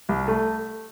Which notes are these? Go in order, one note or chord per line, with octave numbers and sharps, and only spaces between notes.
C2
A3